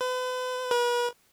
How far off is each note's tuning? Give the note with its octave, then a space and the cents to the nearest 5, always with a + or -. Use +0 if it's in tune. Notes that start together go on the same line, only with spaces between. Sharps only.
B4 +40
B4 -40